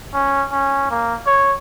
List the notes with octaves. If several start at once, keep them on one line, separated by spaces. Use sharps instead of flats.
C#4
C#4
A#3
C#5